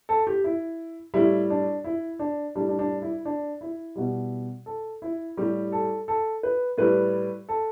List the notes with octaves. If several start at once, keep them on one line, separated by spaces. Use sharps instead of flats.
A4
G4
E4
A2 G3 E4
D4
E4
D4
A2 G3 D4
D4
D4
E4
D4
E4
B2 G3
A4
E4
A2 G3 G4
A4
A4
B4
A2 G3 B4
A4